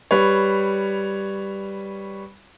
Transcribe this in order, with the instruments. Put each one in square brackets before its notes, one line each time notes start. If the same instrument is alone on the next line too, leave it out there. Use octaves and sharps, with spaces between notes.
[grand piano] G3 B4 C#5